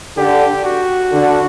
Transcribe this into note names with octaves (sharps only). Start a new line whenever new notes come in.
D3 G4
F#4
D3